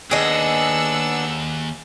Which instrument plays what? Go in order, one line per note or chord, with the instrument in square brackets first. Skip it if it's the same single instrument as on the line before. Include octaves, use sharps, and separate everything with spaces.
[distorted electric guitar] D#2 [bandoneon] B3 D4 [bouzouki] G#4 D#5 [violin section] F#5 E6